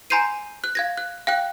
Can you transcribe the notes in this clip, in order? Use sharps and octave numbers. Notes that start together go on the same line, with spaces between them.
G#5 A#5 C6 G6 C7 D#7
F#6
F5 G#6 A#6
F#6
F5 G5 F#6